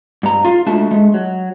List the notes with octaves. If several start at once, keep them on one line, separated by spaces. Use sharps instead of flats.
G2 A#5
F4 F5
G#3 A3 D4 F#4 A5
G#3 A3
F#3